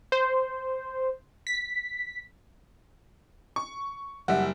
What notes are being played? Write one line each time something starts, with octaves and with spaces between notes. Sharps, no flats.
C5
B6
C#6
F#1 G3 E5 F#5